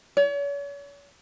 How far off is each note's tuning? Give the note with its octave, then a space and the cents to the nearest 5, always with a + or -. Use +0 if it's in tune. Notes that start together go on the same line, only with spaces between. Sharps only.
C#5 +40